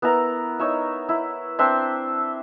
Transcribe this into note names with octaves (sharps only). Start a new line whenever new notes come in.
B3 E4 A#4 A#5
D#4 C#5 E5
E4
C4 D4 E5 C6